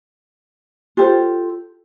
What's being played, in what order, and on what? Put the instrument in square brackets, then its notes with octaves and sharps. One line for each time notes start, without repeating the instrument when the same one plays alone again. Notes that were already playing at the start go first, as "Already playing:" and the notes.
[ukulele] F4 G4 A4 C5